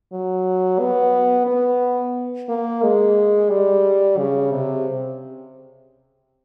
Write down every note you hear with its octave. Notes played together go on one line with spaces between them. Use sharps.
F#3
B3
B3
A#3
G#3
G3
C#3
C3